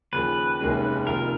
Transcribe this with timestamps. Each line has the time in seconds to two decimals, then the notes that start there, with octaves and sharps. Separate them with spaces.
0.13 D#2 C#3 F3 B4
0.60 F1 D#2 D#3 G#3 C#4
1.07 F1 F2 D#3 A#3 F4 A#4